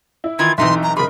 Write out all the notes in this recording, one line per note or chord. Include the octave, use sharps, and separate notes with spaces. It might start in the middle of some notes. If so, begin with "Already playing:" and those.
E4
D#3 E3 F4 G#6
B1 E3 C4 D#4 E5 C6
A#5
F#1 G#4 A#4 B5 C6